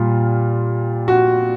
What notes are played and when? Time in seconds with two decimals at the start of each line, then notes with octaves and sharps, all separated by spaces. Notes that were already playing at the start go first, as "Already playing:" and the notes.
Already playing: A#2 G3 F4
1.08 F#4